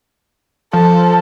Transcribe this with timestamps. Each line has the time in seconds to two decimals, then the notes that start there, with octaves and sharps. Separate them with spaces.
0.73 F3 A4